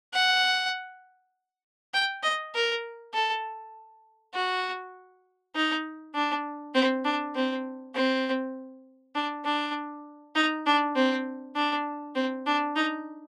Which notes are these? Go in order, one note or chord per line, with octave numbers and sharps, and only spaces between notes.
F#5
G5
D#5
A#4
A4
F#4
D#4
D4
C4
D4
C4
C4
D4
D4
D#4
D4
C4
D4
C4
D4
D#4